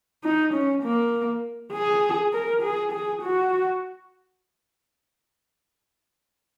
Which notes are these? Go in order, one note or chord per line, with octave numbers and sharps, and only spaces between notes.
D#4
C#4
A#3
G#4
A#4
G#4
G#4
F#4